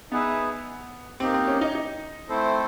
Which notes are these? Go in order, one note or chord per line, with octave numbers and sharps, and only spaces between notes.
B3 D#4 G#4 B4 E5
A#3 C4 D#4 G4
C4
C#4
D#4
D#4
A3 C4 E4 A4 C5